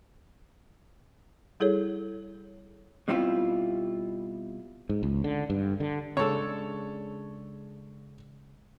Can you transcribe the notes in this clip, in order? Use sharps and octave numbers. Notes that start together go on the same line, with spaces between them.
G3 E4 G#4 A4 C#5
B2 G3 C4 E4 F4
G#2
C#2
D3
G2
D3
C#3 G#3 D4 A4 C#5